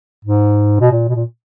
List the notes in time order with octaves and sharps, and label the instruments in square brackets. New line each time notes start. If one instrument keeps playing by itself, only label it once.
[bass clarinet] G#2
B2
A#2
B2
A#2